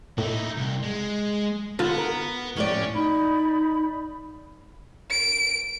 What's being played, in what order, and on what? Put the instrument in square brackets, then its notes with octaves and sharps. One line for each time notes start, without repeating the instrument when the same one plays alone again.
[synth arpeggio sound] A2 [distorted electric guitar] D#4 E4
[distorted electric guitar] C2
G#3
[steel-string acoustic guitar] D3 [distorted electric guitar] B3 [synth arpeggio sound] F4 A4
[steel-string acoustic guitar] A#4
[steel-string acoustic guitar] F2 A2 D5 [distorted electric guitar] C#4
[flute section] D#4 D5 B5
[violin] D7